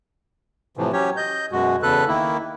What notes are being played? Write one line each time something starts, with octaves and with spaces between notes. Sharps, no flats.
A2 C3 E3 F3
F#3 C#4 G4 C#5
D#5 G6
F#2 B2 G#3 F#4
E2 C#3 A4 B4 F#6
D#3 A#3 E4